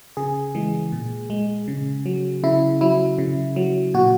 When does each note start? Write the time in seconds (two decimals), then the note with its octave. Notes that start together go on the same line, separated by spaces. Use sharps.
0.17 C#3 G#4
0.55 E3 G#3
0.92 A#2
1.30 G#3
1.68 C#3
2.06 F#3
2.43 C#3 E4
2.81 F#3 E4
3.18 C#3
3.56 F#3
3.94 A#2 F#4